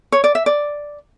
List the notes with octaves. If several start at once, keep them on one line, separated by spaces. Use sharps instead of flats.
C#5
D5
E5
D5